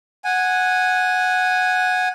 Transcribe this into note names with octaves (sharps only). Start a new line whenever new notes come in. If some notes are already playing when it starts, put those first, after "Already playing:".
F#5 G#5